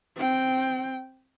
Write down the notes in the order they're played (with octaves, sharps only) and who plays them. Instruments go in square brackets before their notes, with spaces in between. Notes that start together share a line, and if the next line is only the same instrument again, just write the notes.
[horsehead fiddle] C4 G5